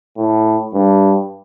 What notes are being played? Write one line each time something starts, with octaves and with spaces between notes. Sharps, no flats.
A2
G2